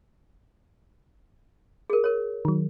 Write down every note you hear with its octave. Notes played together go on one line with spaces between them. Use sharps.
G#4 A#4
A#4 C#5
D#3 F#3